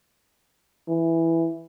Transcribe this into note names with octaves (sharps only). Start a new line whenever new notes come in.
E3